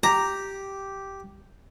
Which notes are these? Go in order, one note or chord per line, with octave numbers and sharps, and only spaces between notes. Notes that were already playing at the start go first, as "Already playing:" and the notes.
G4 A#5